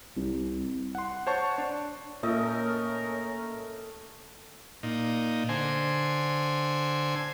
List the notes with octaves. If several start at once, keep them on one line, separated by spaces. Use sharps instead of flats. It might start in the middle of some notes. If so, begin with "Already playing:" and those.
C2
F#5 C6
C5 C#5 F#5 A5 C#6
D4
A#2 A3 C#4 A#4 D#5
A#2 D#4
D3 C5 G#5